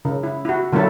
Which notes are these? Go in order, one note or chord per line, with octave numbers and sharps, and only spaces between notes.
C#3
E4
E4 F#4
D3 F#3 A#3 E4 A4